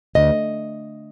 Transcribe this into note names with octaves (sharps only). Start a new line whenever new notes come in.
D2 D#5